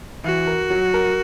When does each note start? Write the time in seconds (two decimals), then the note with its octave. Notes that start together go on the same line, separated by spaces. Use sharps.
0.24 E3 F#4
0.47 A#4
0.70 F#3
0.94 A#4